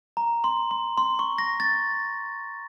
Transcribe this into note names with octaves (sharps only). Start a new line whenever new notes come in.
A#5
C6
C6
C6
C#6
A#6
A6